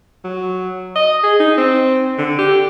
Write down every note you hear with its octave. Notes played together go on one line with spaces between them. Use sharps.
F#3
D#5
G#4
D#4
C4
D3
G4